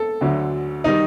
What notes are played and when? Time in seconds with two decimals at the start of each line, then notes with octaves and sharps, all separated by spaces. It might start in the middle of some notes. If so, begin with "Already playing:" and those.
Already playing: A4
0.21 D2 D3 F#3
0.84 D#3 G3 D#4